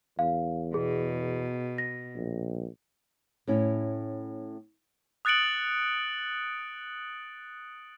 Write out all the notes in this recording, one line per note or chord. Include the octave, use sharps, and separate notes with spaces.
E2 F5
B2 G#4
A#6
A#1
A2 C#4 E4
D#6 F#6 A6 C#7 D7 F#7